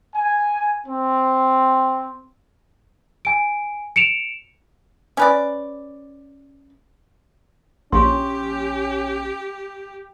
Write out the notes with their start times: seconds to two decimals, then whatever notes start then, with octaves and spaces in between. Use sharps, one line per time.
0.15 G#5
0.86 C4
3.25 G#5 D7
3.96 C#7 D7 E7 F7
5.17 C#4 B4 D5
7.92 A#1 C#4 G4 C6 C#6